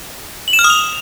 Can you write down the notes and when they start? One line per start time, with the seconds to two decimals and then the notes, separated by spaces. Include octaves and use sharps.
0.48 F#7
0.53 E7
0.59 F6
0.64 D#6
0.70 F7